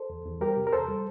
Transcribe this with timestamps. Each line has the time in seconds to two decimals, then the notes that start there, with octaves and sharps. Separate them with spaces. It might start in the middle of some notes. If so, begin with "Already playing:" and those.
Already playing: A4 C5
0.10 E2
0.25 E2
0.41 G3 G4 A#4
0.56 C3
0.67 A#4
0.72 E2 A4 C5
0.88 G3